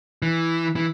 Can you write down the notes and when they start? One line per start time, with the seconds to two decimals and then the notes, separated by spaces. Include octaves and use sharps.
0.22 E3
0.76 E3